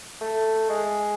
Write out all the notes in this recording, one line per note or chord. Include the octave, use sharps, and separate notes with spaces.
A3
G#3